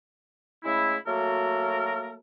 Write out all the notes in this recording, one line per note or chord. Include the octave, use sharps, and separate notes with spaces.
C#3 G#3 A3 E4
F#3 A3 A#3 F#4 A4 A#4